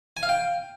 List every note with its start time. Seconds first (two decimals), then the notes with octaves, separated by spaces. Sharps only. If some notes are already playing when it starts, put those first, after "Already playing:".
0.17 G#5
0.23 F5
0.29 G5